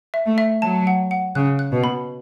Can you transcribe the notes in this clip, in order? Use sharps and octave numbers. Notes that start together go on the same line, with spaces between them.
E5
A3
E5
F#3 A5
F#5
F#5
C#3 F#6
F#6
B2
B5